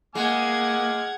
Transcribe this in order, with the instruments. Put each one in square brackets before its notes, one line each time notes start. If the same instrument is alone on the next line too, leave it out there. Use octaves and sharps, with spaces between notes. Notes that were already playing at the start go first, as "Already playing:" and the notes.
[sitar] G#3 [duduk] A#3 [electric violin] F#5 G#6 [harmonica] G#5 D6 F6